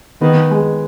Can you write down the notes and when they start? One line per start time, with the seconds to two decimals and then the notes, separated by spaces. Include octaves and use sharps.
0.21 D#3 B3
0.51 G#3